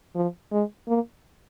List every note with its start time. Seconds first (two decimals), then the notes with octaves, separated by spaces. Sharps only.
0.15 F3
0.52 G#3
0.88 A#3